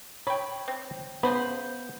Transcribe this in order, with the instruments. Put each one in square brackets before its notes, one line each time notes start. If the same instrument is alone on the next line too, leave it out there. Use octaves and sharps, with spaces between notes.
[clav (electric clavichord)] C#5 [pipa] G5 B5
[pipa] C4
[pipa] C#3 C5 B5 [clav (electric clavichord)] B3